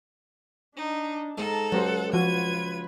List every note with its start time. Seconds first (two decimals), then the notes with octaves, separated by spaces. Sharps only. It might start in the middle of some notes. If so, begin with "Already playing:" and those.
0.77 D4 D#4
1.38 G#2 A4 A5 A#5
1.72 C#2 F#3 G4 C5 F#5
2.13 F3 F4 F#4 B4 G#6 D#7